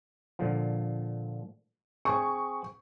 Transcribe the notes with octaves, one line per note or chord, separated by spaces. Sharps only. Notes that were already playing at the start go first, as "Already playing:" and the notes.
A#2 D3 F3
C4 G#4 C#6